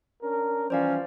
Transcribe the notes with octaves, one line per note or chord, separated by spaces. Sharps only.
C#4 D4 A#4
E3 F3 G3 C#4 C5 D5 F5